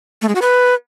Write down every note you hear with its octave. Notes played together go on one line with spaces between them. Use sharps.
A3
G#3
F#4
B4